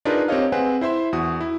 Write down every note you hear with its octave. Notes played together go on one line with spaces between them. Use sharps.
D4 D#4 F4 G#4 A#4 B4
C4 G4 A#4 C#5 D#5 F5
C4 G#4 B4 C5 F#5 G#5
E4 C5 E5 C6
E2 F#4 D#6
E4